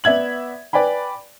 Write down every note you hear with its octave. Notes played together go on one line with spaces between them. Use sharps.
B3 D5 E5 G#6 F#7
B4 D5 G5 G#5 B5